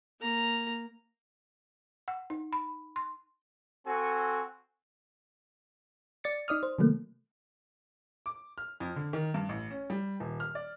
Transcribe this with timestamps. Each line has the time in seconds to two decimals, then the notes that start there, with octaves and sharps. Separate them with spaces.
0.20 A#3 A#5
2.08 F#5
2.30 D#4
2.53 B5
2.96 C6
3.85 C4 F#4 A4 G#5
6.24 D5 A6 C#7
6.48 D#4 D5 D#6 F6
6.63 C5
6.79 C3 D#3 F#3 A3 A#3
8.26 D6
8.58 F6
8.80 F2
8.96 D3
9.13 D#3
9.34 G2
9.49 A1
9.71 C#4
9.90 G3
10.20 D#1
10.40 F6
10.55 D5